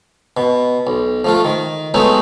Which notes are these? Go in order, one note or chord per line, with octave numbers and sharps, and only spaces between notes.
B2
B1
F3 A3 F4
D#3
F#3 G#3 A3 B3 D#4 E4